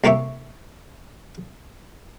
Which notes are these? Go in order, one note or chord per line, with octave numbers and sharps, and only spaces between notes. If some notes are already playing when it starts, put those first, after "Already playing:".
C2 A#3 G4 C#5 E5